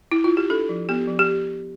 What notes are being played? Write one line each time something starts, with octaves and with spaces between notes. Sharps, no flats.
E4
F4
G4
D4 A4
F3
B3 G4
F3
G4